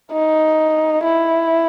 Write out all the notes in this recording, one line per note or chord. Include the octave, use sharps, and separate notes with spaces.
D#4
E4